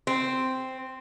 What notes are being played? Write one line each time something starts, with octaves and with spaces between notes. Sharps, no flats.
C4